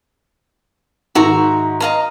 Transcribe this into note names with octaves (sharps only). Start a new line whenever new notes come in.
G#2 D#3 F#4 E5 A#5
D#5 F5 A#5